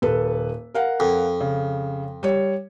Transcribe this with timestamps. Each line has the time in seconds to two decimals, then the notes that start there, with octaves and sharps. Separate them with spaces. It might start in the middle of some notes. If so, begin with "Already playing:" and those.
0.02 D#1 A4 B4
0.74 A#4 F5 F#5
1.00 F2
1.40 C#3
2.23 G3 C#5